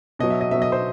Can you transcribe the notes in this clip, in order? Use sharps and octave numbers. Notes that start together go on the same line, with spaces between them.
B2 F#3 D#5
E5
D#5
B2 F#3 E5
D#5
C5